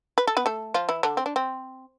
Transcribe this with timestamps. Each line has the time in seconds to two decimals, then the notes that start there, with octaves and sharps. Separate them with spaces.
0.18 B4
0.27 A4
0.37 B3 B4
0.46 A3 A4
0.74 F3 F4
0.89 E3 E4
1.03 D3 D4
1.17 C4
1.26 D4
1.36 C4